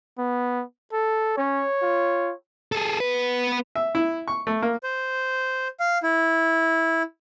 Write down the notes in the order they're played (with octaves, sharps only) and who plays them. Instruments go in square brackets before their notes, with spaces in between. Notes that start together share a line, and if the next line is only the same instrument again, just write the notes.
[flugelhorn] B3
A4
[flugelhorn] C#4 [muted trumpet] C#5
[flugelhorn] F4
[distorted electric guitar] G#4 A4
B3 B4
[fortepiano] E5
E4
C#6
A3
A#3
[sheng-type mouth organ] C5
F5
E4